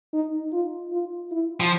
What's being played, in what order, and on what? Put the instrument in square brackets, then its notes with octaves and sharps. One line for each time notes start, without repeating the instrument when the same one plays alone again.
[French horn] D#4
F4
F4
E4
[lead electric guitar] F3